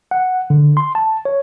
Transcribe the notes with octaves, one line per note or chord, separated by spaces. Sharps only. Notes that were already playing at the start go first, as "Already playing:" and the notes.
F#5
D3
C6
A5
C#5